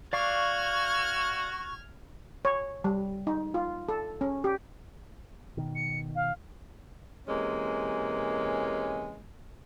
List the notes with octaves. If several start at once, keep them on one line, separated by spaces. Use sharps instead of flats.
F#4 D5 F5 C#6 D6 F6 G#6
C#5
G3
D#4
F4
A4
C#4
G4
B2 D#3
C#7
F5
C3 E3 G#3 A#3 C#4